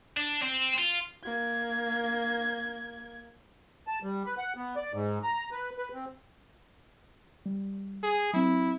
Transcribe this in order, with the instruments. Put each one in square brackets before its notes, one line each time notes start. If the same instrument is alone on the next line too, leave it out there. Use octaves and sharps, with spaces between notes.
[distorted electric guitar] D4
C4
F4
[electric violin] A#3 G#6
[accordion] A5
G3
B4
F#5
B3
D5
G#2
A#5
B4
B4
C4
[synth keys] G3
[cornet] G#4
[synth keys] F#3 C4 [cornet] E4